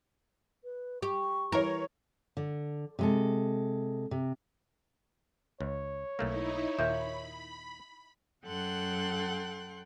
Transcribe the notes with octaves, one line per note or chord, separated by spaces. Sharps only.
B4
G4 C#6
E3 A#4 C#5
D3
C3 G#3 A4
C3
C#2 C#5
B1 A3 A#3 D#4 E4
D#2 A#2 A#3 E5 B5 G6
F#2 A4 F#5 G5 C6 F#6